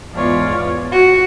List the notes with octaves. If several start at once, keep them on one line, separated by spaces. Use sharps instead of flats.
E2 G#2 B3 F4 C#5 D5
F#4